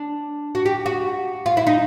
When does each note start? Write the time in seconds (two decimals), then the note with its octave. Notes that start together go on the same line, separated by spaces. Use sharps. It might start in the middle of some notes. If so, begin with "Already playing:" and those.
Already playing: D4
0.55 F#4
0.66 G4
0.86 F#4
1.46 F4
1.57 E4
1.67 D#4